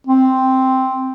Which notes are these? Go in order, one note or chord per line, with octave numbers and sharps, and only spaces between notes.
C4